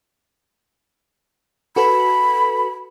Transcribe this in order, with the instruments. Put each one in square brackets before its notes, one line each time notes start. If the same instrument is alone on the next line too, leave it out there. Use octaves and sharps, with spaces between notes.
[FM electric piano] F#4 A4 B4 [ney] B5